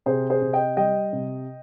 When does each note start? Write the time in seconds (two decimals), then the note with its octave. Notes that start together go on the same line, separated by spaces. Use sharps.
0.06 C3 G#4 C5
0.30 G#4 C5
0.42 C3
0.53 D#5 G5
0.77 G3 D#5 G5
1.13 C3